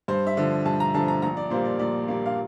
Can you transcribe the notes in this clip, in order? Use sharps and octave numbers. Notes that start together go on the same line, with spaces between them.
G2 C5
E5
D3 F3
G2 A5
A#5
D3 F3 A5
A#5
A#1 A#5
D5
A#2 G3 A#3 C5
D5
A#1 D5
A#2 G3 A#3
F5